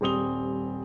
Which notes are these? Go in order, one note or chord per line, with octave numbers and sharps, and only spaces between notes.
D#1 G3 C4 D#6 F7 G7